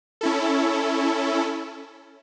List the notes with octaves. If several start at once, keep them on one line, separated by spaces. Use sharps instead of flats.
C#4 E4 A4